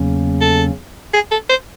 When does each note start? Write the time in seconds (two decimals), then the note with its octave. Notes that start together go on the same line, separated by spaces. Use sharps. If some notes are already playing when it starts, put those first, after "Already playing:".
Already playing: E2 C#3 F#3 A#3 C#4
0.41 A4
1.14 G#4
1.31 A4
1.49 C5